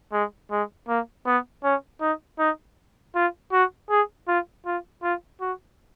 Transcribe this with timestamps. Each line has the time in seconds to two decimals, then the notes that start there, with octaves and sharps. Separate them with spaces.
0.12 G#3
0.51 G#3
0.88 A#3
1.26 B3
1.64 C#4
2.01 D#4
2.39 D#4
3.15 F4
3.52 F#4
3.90 G#4
4.28 F4
4.66 F4
5.03 F4
5.41 F#4